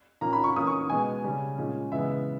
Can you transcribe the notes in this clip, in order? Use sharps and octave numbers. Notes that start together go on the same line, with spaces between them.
A#2 A#3 C#4 A#5
B5
C#6
E3 A#3 C#4 D#6
C#6
B2 G#3 B3 G#5
C#3 G3 C#4
A#2 G#3 C#4
C#3 E3 G#3 B3 E5